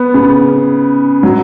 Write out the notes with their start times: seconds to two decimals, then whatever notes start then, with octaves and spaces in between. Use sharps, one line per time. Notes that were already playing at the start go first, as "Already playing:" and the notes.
Already playing: B3
0.14 C#3
1.23 F#3